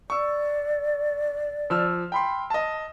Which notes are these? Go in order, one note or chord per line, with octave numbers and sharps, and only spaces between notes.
D5 C#6 E6
F3 E6 F6
G5 B5 C6
D#5 A5